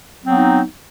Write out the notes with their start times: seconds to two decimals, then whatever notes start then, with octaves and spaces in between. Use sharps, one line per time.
0.22 F#3
0.26 C4
0.30 B3
0.35 D#4